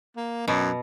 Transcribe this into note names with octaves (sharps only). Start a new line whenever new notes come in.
A#3
F#2 B2